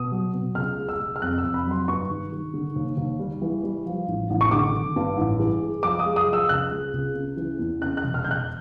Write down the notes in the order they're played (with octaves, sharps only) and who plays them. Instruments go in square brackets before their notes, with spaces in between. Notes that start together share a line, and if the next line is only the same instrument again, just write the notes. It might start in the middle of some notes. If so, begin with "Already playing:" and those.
Already playing: [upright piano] B2 D#6
F#3
B2
C#2 F6
G#3
E6
G#3
F6
F2 F#6
E6
F2
B5
F#3 C6
G2 C#6
D#3
D#3
D3
D#2
D#2
G3
E3
G3
F3
A1
A1
C#6
D3 D6
G#1
G2
A1
E3
G#3
F3 D6
D#6
G#3
D#6
F3
E6
C#2 F#6
G#3
C#2
C#3
E3
E2
C#3 F#6
F#6
E1
F6
E1 G6
F#6